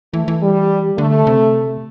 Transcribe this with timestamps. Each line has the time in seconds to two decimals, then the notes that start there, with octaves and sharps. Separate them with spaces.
0.14 E3 A3
0.28 E3
0.41 G3
0.98 D3 A3
1.27 C3